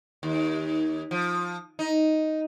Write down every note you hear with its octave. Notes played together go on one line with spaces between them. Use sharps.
D#2
F3
D#4